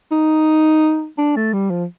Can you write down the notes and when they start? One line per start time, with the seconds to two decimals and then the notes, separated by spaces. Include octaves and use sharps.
0.11 D#4
1.18 D4
1.36 A3
1.53 G3
1.70 F3